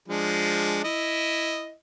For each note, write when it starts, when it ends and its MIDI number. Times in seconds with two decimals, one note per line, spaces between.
0.08 0.84 53
0.08 0.84 56
0.08 0.84 62
0.84 1.73 64
0.84 1.73 75